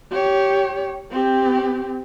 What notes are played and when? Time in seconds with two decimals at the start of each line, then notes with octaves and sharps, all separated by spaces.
0.11 G4 C#5
1.11 C4 G4